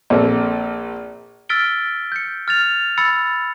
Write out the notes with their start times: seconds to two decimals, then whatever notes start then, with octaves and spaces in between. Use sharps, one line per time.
0.10 A#1 C4 A4 A#4
1.49 E6 F6 A6 B6 D7 G7
2.12 G6 C#7
2.48 F6 A6 F7
2.98 B5 E6 A6 C#7